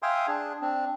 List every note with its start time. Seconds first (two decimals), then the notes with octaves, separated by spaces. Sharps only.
0.03 E5 F5 G5 G#5 C6 D#6
0.27 D4 G#4
0.62 C4 D4